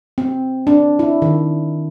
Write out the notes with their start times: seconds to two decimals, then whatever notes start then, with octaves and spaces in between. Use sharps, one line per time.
0.18 C4
0.67 D4
0.99 E4
1.22 D#3